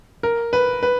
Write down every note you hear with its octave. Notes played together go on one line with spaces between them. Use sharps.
A#4
B4
B4